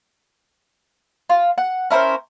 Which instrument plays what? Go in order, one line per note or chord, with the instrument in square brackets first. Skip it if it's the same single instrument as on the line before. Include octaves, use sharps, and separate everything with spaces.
[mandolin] F4
F#5
C#4 E4 A#4 C5